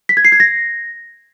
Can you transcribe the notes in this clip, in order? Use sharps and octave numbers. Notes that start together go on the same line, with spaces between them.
B6
G#6
C7
G#6
A#6